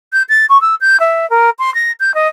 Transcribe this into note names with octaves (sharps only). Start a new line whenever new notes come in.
G6
A6
C#6
E6
G6
E5
A#4
C6
A#6
G6
D#5